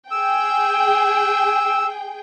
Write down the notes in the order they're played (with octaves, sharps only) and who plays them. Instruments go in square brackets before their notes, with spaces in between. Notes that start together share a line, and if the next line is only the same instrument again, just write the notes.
[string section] G#4 G5 [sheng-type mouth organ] E6